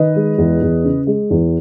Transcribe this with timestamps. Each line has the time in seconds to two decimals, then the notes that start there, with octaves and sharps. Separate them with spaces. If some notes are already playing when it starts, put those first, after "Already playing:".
Already playing: D#3 B4 D#5
0.16 G#3
0.38 E2
0.62 E2
0.84 C#3
1.07 G#3
1.30 E2